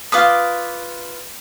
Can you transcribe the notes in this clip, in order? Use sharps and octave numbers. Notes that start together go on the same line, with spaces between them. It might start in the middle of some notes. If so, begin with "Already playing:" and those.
F4 B4 D6 D#6